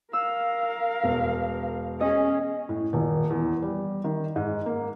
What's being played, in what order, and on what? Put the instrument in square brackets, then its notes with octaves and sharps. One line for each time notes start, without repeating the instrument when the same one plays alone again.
[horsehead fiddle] A#4 F5 [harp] E6
[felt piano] E1 B4
[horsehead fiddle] C#4 G#4 [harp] D#5
[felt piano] A2
D#1
E2
G3
D#3
G#2
A#3